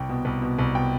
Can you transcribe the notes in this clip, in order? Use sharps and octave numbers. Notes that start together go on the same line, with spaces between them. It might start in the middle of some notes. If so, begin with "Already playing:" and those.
Already playing: C2 G5
B2
C2
B2
C2
B2 G5